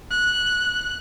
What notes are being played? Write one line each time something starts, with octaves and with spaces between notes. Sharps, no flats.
F#6